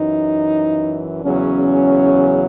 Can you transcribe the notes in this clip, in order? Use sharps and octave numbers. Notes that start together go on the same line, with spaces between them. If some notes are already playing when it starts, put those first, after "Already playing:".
Already playing: F#2 E3 D#4
E2 C#3 F#3 C#4